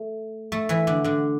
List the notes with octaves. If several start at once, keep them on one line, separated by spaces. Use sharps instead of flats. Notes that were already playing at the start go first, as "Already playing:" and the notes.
Already playing: A3
A3 A4
E3 E4
D3 D4
D3 D4